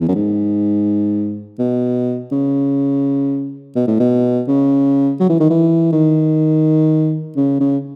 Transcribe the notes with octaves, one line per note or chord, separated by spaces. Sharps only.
E2
F#2
G#2
B2
C#3
B2
A2
B2
C#3
F#3
E3
D#3
E3
D#3
C#3
C#3